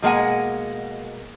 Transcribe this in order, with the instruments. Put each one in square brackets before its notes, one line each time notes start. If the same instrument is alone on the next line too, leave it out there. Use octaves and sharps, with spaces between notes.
[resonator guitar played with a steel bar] B2 G#3 A#3 F#5 G#5